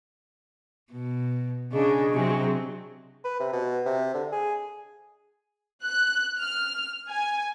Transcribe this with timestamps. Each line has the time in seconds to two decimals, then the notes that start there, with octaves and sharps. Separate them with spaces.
0.92 B2
1.73 C#3 D4 G#4 D#5 C#6
2.12 C3 F#3 C4
3.24 B4
3.40 C3
3.53 B2
3.86 C3
4.14 D3
4.32 G#4
5.83 F#6
6.39 F6
7.08 G#5